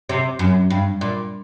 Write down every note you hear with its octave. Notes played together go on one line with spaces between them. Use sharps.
C3
F#2
G2
A#2